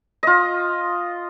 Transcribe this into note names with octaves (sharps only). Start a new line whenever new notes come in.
F4 D#5